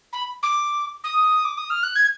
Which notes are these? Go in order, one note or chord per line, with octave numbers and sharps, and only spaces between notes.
B5
D6
D#6
D6
D#6
F6
F#6
G#6